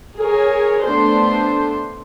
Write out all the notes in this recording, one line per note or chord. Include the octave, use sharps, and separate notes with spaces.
G#4 A#4 C#5
A3 B3 D4 C5